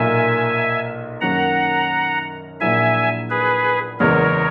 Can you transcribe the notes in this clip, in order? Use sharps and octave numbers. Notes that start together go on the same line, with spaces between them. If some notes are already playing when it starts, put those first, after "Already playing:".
Already playing: B1 A#2 A#3 E5 G#5
F#2 D#3 F#3 A#3 C#4 F#5 A#5
A#1 A#2 F#3 A#3 E4 E5 G#5
G#4 B4
F#1 E2 C#3 G#3 B3 A#4 C#5